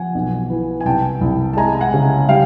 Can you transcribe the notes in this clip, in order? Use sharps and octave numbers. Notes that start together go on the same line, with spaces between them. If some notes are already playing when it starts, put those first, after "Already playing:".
Already playing: F3 F#5 G#5
B1
E3
G#5
C2 G5 A5
C2
A5
G#3 G#5 A#5
F#5 G#5
C#3
G3 F5 G5